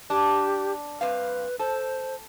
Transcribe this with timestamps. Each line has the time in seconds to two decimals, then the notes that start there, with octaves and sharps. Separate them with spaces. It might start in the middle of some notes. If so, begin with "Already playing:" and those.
0.10 D4 G4
1.01 G2 C4 B4 F5
1.59 A4 C5